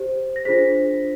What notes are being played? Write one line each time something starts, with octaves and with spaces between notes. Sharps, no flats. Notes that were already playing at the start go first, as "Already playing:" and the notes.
Already playing: G4 C5
A#6
D4 F4 G#4 C5 B6